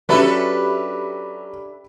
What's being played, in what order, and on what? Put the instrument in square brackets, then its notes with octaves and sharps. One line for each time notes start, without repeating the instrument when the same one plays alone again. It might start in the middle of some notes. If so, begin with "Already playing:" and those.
[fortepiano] F#3 C#4 [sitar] D4 A4 B4 [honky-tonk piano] G4 E5 B5